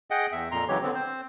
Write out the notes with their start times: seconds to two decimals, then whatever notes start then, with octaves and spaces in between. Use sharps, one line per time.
0.11 G#4 D#5 F#5 G5
0.32 E2 E5
0.52 F2 A#2 A#5 C6
0.68 C#3 E3 F#3 G#3 G4 C#5
0.83 D3 B3 C4
0.95 C4 C5